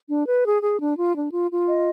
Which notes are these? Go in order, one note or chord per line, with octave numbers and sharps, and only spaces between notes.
D4
B4
G#4
G#4
D4
F4
D4
F4
F4
D#5